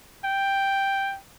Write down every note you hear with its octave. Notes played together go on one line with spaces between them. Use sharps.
G5